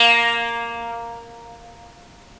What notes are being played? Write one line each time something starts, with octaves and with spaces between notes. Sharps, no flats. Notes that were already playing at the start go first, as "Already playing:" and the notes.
Already playing: A#3